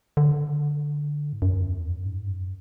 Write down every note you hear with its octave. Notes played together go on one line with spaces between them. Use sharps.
D3
G#2
F#2
E2
F#2
G#2
F#2